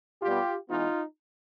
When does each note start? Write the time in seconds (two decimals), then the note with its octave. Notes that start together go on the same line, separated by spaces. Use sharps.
0.22 B2 G3 B3 F4 G4
0.69 E3 G#3 B3 D#4 F4